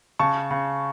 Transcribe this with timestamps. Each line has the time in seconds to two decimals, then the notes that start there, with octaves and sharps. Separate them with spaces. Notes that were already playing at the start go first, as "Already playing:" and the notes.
0.19 C#3 A5 C#6
0.51 C#3